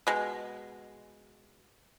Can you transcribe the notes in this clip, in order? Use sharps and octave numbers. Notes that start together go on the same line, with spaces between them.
B2 G#3